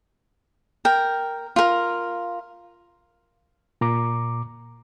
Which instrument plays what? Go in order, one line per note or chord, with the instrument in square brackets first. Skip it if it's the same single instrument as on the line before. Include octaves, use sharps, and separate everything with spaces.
[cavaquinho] A#4 G5
F4 A#4
[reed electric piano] A#2 A#5 D6